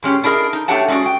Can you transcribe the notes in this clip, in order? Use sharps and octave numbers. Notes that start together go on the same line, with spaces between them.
G#2 G#3 C#4 G4
D4 E4 G#4 A#4 D#5
D#4
A3 D4 G4 C#5 F#5 A5
G#3 C#4 E4 F#4 D5
G5